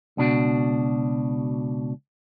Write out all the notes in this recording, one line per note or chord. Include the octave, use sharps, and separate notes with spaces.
C#2 B2 D4 F#4